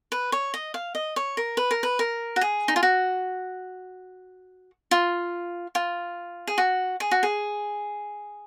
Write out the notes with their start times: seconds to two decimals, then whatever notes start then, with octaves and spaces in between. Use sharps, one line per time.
0.12 B4
0.32 C#5
0.54 D#5
0.74 F5
0.95 D#5
1.16 C#5
1.37 A#4
1.57 B4
1.71 A#4
1.83 B4
1.99 A#4
2.36 F#4
2.41 G#4
2.68 D#4
2.76 F4
2.83 F#4
4.91 F4
5.75 F4
6.47 G#4
6.58 F#4
7.00 G#4
7.11 F#4
7.23 G#4